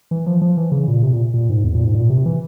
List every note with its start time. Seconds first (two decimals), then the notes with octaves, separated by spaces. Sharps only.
0.11 E3
0.26 F3
0.42 F3
0.57 E3
0.72 C#3
0.88 A#2
1.03 C3
1.12 A#2
1.34 A#2
1.49 G#2
1.64 E2
1.75 A#2
1.85 G#2
1.95 A#2
2.10 C3
2.26 E3